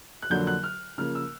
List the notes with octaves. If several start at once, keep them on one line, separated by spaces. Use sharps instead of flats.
F#6
F2 D3 F#3 A#3 D4 G6
F#6
F6
C#3 F3 A#3 F6
E6